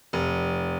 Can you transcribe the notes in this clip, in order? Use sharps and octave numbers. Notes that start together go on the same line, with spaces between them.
F1